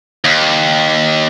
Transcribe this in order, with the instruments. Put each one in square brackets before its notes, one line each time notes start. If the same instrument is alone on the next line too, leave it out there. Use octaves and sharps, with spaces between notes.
[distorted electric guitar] D#2